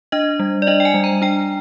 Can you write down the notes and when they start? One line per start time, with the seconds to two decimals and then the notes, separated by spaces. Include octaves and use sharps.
0.12 D4 D#5
0.40 G3
0.62 D5
0.67 D4 D#5
0.80 G5
0.85 G#5
0.94 G3
1.04 A#5
1.22 D4 G5